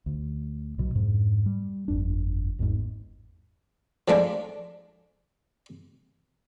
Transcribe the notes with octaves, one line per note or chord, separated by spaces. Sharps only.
D2
B1 B2 F#3
F2 G#2
G3
G1 F2 D4
G#1 E2 G#2
F3 G#3 A3 D4